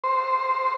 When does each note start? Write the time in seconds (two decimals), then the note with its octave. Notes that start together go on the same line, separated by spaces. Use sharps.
0.04 C5